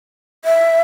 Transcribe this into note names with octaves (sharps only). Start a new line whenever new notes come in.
E5